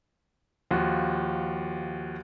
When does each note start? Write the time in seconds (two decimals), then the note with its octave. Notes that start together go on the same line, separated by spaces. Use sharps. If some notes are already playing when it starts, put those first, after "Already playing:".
0.71 D#2 F3 F#4